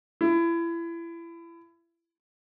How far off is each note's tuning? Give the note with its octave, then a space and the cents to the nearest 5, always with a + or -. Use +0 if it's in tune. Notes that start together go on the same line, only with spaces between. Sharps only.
E4 +30